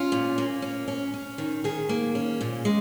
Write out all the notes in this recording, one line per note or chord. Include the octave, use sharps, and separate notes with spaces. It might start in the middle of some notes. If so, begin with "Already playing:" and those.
Already playing: C#4 F4
A#2
A#3
C#4
C#4
C#4
D#3
D#3 G#4
A#3
C#4
A#2
G#3